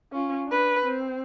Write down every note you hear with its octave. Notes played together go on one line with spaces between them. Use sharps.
C#4 F4
D4 B4
C4